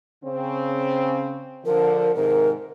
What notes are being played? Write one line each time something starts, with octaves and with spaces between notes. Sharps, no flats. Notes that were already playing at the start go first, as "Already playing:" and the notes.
C#3 C4
D3 F3 A#4
G#2 C3 D#3 A#4